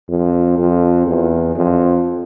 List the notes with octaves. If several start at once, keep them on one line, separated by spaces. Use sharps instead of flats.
F2
F2
E2
F2